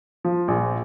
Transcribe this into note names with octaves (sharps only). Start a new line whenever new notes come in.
F3
A#1